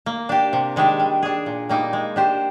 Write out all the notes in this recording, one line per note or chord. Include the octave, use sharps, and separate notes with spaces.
A#3
D4 G4
C3
D#3 G#3 D4 G4
G3
D4 G#4
A#2
G3 A#3 D#4
G#3
D4 G4 C5